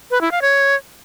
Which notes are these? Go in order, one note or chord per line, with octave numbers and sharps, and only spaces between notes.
B4
E4
F5
C#5